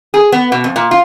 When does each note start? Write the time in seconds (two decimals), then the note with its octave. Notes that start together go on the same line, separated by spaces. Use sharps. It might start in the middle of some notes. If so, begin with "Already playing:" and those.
0.14 G#4
0.32 B3
0.52 B2
0.64 F2
0.76 A#2
0.91 F4